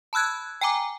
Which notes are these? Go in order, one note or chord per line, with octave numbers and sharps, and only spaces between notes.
A5 B5 E6 F#6 G#6
G5 G#5 A#5 D6